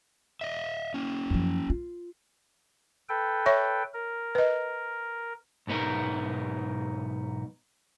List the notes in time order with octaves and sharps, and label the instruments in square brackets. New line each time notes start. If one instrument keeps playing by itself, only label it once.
[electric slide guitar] D#5 E5
A#3 C#4
[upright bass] F#2 F3
F4
[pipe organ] A4 B4 G5
[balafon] C#5 E5 C#6
[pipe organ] A#4
[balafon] B4 D#5
[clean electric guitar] B1 G#2 B3 D#4 A#4